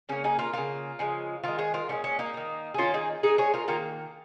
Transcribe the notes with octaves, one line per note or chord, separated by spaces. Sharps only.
C#3 A#3 C#4
D#4 G#4
F4 A#4
C#3 A#3 F4 A#4
C#3 F3 G#3
D#3 G#3 F4 A#4
G#4 C#5
F4 A#4
A#2 F3 G#3 C#4
C#4
A#3 D#4
D#3 A#3
G#4
D#3 A#3 C#4 F4
D#4 G#4
A#2 G#3 D#4 G#4
G#4 C#5
F4 A#4
D#3 A#3 F4 A#4